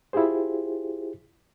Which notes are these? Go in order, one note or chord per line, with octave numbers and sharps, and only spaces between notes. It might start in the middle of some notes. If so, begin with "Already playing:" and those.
E4 F4 G4 G#4 C5